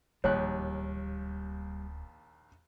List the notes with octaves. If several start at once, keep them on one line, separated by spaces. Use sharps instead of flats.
D1 A#1 D#2 G3 C#5 F#6